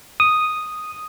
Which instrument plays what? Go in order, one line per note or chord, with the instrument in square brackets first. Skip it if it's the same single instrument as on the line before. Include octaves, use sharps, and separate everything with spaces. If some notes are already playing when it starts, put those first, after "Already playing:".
[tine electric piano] D#6